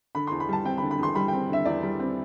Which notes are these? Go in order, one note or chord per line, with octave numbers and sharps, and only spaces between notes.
D3 B5
C6
E2
B5
G3 A5
C4 G5
B5
D3
B5
E2 C6
G3 B5
G5
C4
D3 E5
E2 D5
G3
C4